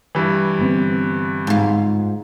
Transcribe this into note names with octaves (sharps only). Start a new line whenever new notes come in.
G2 E3
G1 B3 C4
G#2 F4